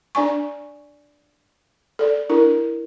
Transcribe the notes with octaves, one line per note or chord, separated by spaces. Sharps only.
D4 D5 G#5 C#6
A4 D5
D4 E4 A#4